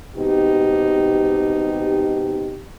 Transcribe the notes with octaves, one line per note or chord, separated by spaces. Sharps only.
G#2 B2 C4 D#4 G4